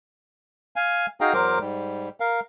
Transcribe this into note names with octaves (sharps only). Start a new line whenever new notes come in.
F5 G#5
D#4 F#4 G#4 F5 G5 A#5
E2 F#3 A#4 C5 D6
G#2 G3
A#4 F5